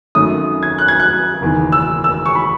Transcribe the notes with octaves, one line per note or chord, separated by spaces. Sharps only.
G#1 F#2 D#3 F#3 A3 D#6
G#6
F#6
G#6
F#6
F#1 E2 D#3
E6
E6
C#6
B5